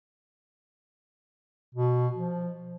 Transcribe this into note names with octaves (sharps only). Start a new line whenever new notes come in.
B2
F3